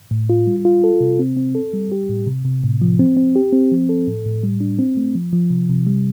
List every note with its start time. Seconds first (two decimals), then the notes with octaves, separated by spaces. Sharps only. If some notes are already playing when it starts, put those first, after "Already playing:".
0.11 A2
0.30 F4
0.47 G3
0.65 F4
0.84 A4
1.01 C3
1.19 C4
1.37 C4
1.55 A4
1.74 G3
1.92 G4
2.09 A2
2.27 C3
2.45 C3
2.64 A2
2.82 F3
2.99 C4
3.17 C4
3.35 G4
3.53 C4
3.71 F3
3.89 A4
4.07 A2
4.25 A2
4.43 G3
4.60 D4
4.79 C4
4.97 A3
5.15 F3
5.32 F3
5.50 C3
5.69 C3
5.87 G3